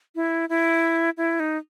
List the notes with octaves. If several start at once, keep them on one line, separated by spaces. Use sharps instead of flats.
E4
E4
E4
D#4